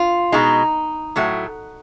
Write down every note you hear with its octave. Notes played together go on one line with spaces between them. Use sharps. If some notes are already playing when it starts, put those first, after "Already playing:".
Already playing: F4
B2 G#3 D#4
A2 F#3 A3